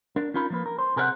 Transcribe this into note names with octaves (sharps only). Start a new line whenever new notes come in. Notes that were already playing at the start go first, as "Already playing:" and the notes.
D4 A#4
C#4 D#4 F4 A#4 B5
F3 A#3 B4
A#4
C5
C3 G#4 A#4 C5 E5 F#5